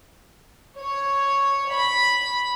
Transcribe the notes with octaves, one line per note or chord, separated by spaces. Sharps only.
C#5
B5